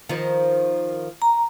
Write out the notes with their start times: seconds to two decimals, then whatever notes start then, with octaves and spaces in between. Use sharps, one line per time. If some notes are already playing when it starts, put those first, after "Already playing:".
0.09 D#3 F3
1.22 A#5